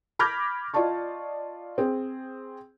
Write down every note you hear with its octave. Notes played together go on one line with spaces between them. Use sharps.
B5 D6 F6 G6 G#6 A#6
F4 D5 D#5 A5 C#6
C4 G#4